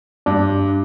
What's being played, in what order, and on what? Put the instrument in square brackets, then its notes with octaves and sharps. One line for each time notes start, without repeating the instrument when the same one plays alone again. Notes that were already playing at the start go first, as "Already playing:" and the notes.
[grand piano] G2 [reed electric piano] D4